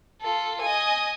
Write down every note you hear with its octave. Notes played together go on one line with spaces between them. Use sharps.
F4 A4
D#5 G#5